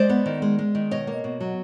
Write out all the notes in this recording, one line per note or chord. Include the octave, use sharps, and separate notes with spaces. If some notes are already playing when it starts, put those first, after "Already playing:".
Already playing: G#3 C5 D5
B3
D#3
G#3
G#3
D#3
B2 C#5 D#5
A#3
B2
F#3